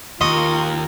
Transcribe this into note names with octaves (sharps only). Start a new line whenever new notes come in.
D#2 F4 A#4 D#5 C6 C#6 D#6